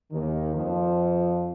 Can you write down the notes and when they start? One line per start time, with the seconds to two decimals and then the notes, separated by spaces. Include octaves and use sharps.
0.12 D#2 D#3
0.55 F2 F3